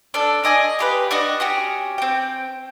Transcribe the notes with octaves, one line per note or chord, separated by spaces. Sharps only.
D4 A4
D5 D#5 G#5 D#6
F4 G4 B4
D4 F#4 D#5
C#4 F#4 G4
C4 G5